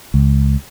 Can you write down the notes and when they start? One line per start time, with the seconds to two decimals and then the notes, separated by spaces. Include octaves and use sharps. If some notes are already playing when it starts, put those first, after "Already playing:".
0.14 C#2